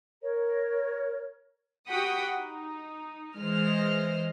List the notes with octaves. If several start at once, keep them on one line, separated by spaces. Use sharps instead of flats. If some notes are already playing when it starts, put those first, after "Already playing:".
A#4 C#5
F#4 G4 F#5 G5 B5 D#6
D#4
E3 G#3 C5 D#5 F6